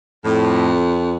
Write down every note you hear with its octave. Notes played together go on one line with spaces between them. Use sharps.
F2 A2